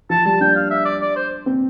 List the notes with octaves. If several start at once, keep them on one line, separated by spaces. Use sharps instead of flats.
F3 A5
G3 A5
D4 G5
F5
E5
D5
D5
C5
C4